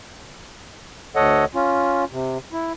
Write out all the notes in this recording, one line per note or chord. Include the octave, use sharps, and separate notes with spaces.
D2 A4 C#5 D#5 F#5
C#4 F4
C3
E4